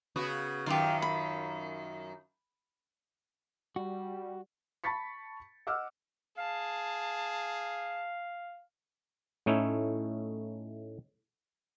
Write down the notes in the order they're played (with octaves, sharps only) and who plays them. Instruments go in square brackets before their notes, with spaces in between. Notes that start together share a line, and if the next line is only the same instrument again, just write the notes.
[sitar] C#3 B3 F#4
[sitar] F#2 D#3 F4 [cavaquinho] G4 F5
[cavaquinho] B5
[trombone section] G3 [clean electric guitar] F#4
[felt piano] A5 B5 C#6 A6 B6 C#7
D#5 F#5 D6 E6 F6
[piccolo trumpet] G#4 [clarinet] F5 [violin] A5
[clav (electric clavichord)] A2 A3 C#4 D#4 E4